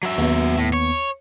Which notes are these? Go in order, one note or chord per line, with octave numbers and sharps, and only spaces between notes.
F#3 E5
D#2 B3
A2
C#5